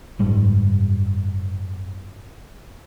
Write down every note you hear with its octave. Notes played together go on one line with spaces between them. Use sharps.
F#1 G#2 G3